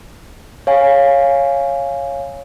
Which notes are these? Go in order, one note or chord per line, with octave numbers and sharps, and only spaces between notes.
C#5 F5 G#5